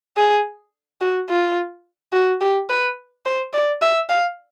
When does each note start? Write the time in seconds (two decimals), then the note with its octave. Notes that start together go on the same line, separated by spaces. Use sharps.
0.17 G#4
1.01 F#4
1.29 F4
2.12 F#4
2.41 G4
2.69 B4
3.25 C5
3.54 D5
3.82 E5
4.10 F5